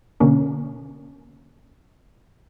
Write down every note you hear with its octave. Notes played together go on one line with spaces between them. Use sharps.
B2 D3 A#3 C#4